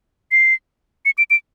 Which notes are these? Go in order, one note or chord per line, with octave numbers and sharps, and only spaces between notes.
C7
C#7
D7
D7